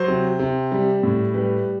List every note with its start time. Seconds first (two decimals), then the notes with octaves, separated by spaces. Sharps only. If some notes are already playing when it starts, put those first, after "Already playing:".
Already playing: F#3 C5
0.08 C3
0.39 C3
0.72 G3
1.03 A2
1.34 G3 B4